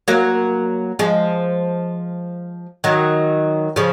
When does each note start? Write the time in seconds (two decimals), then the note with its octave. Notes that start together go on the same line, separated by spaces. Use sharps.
0.08 F#3 A#3
0.99 F3 G#3
2.84 D#3 F#3
3.76 C#3 F3